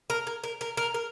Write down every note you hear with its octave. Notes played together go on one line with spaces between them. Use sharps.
A#4
A#4
A#4
A#4
A#4
A#4